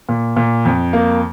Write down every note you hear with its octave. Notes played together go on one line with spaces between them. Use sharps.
A#2
A#2
F2
A#3